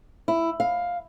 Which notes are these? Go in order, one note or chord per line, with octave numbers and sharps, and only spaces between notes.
E4
F5